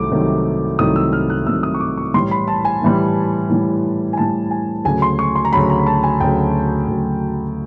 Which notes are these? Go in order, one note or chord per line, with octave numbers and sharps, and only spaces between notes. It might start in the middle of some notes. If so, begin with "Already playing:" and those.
Already playing: C2 C3 D#3 F#3 A3 D6
C2 C3 D#3 F#3 A3
C2 C3 D#3 F#3 A3 D#6
E6
F6
F#6
C2 C3 D#3 F#3 A3 E6
D#6
C#6
D6
C#6
A2 E3 G3 C6
B5
A5
G#5
A2 E3 G3
A2 E3 G3
G#5
A2 E3 G3 A5
G#5
D2 C#3 F#3 G#5
C6
C#6
C6
A#5
D2 C#3 F#3 B5
A#5
A5
G#5
D2 C#3 F#3 G5
D2 C#3 F#3